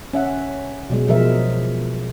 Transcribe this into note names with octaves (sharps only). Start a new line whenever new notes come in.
C#4 E5 F#5
B2 F#3 G#3
B2 F3 F#3 G#3 A#4 E5